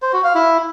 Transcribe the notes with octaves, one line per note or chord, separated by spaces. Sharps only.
C5
F#4
F5
E4